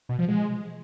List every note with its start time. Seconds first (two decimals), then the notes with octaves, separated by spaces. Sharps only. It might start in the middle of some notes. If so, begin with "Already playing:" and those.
0.09 B2
0.19 F3
0.28 G#3